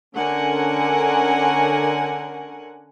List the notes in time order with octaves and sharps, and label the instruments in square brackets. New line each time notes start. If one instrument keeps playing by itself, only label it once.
[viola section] D3 C#4 A#4 F#5 G#5